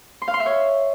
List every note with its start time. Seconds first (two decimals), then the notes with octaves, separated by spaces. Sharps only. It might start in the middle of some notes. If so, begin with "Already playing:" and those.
0.22 C6
0.28 F5
0.34 C6
0.40 E5
0.46 C#5